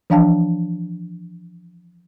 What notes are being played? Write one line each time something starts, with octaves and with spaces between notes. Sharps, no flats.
E3 F3 D4 F5 G5 A5